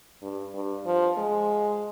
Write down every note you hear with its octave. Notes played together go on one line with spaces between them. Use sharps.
G2
G2
F3
G#3